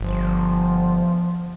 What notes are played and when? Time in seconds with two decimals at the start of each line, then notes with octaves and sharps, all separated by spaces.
0.01 G1 F3